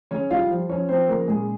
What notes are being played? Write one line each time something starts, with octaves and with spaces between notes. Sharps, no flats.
C#3 C#4 C#5
G3 F4 F5
F3
F3 C#4 C#5
F3 C4 C5
C#3 A#3 A#4
A#2 G#3 G#4